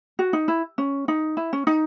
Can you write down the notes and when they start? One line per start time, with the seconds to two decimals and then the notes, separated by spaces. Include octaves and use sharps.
0.19 F#4
0.33 D#4
0.48 E4
0.78 C#4
1.08 D#4
1.37 E4
1.53 C#4
1.67 D#4